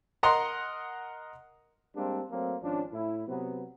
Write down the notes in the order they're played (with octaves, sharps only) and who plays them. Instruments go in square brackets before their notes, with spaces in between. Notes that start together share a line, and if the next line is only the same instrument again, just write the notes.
[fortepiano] A#4 D#5 F#5 A#5 C6
[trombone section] G3 G#3 A#3 C4 D4
F#3 A3 A#3 C4
G#1 F3 C#4 D4
A2 E4
C3 F#3 B3